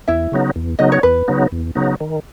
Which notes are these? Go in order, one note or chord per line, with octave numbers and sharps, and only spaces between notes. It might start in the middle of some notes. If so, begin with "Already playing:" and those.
E2 E4 E5
C#3 F#3 B3 D#4
E2
C#3 F#3 B3 D#4 D#5
C#5
E2 B4
C#3 F#3 B3 D#4
E2
C#3 F#3 B3 D#4
D#3